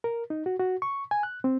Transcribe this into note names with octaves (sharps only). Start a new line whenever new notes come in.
A#4
D#4
F#4
F#4
C#6
G#5
F#6
C4